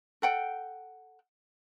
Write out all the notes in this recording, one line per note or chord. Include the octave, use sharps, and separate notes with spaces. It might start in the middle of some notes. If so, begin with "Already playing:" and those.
A4 F#5 G5